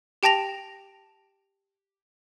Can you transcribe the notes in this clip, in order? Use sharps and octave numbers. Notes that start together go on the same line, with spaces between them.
G4 G5 A5 A#6 F7